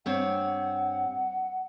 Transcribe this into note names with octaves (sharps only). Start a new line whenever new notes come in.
G2 C4 C#5 F#5